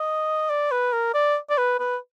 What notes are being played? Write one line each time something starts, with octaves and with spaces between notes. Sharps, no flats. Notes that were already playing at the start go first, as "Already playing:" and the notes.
Already playing: D#5
D5
B4
A#4
D5
D5
B4
B4